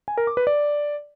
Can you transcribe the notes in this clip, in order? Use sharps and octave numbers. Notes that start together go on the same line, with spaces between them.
G#5
A#4
D6
B4
D5